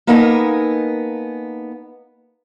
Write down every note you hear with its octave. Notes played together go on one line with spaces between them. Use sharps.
A#3 B3 D#4 A4 A#4 G#5